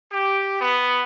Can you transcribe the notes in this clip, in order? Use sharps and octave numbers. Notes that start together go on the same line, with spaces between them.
G4
B3